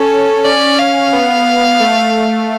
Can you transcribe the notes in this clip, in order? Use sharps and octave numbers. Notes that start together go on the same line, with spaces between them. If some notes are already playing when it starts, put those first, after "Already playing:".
Already playing: C#4 A4
C#4 D5
F5
B3
A3